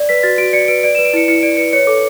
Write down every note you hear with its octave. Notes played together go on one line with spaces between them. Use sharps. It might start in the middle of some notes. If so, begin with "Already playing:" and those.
Already playing: D5
B4 B6
F#4 A6
F#4 D7
D5 C#7
B4 D7
D5 D7
B4 E7
D7
E4 C#7
E4 C#7
D5 D7
B4 C#7
C#5 C#7
A4 D6